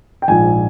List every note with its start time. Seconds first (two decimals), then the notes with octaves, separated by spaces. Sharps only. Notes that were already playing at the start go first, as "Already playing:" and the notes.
0.22 G5
0.28 A#1 G#2 F3 G#5